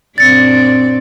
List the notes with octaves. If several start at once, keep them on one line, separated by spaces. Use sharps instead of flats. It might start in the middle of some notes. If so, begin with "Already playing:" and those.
F#2 A#2 C4 D4 D5 A6 C#7